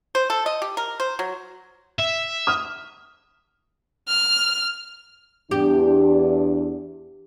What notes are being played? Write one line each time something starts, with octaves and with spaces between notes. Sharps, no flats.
C5
A4
D#5
G4
A#4
C5
F#3
E5
D#6 F6
F6
E2 D4 G4